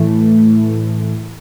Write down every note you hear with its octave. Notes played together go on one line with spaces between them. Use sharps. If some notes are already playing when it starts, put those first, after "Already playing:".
Already playing: A2 E3 A3